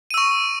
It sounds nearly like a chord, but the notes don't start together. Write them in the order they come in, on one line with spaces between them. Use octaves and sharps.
D#7 E6 C#6